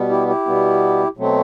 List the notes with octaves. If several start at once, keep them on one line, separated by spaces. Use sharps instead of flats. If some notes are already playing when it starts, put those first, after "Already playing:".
Already playing: B2 G3 B3
E4 G4
E4 G4
B2 G3 B3
B2 F#3 A3 C4